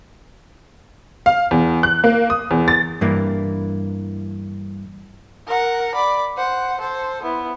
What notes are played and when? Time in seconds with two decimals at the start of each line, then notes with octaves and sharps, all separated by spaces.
1.26 F5
1.51 E2
1.83 F#6
2.04 A#3
2.30 D#6
2.51 E2
2.68 A6
3.01 G2 E3 A#3 E4
5.47 A#4 F#5
5.94 D5 B5
6.37 C5 F#5
6.80 A4 C5
7.23 B3 E4